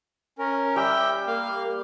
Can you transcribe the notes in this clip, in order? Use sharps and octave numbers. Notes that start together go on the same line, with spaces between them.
C#4 A#4
G3 E5 G5
A#3 F5